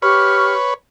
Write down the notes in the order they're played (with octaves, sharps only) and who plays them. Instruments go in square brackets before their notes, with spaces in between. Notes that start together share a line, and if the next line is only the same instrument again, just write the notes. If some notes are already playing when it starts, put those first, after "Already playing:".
[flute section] G4 C#6 F6 [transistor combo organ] B4 C#5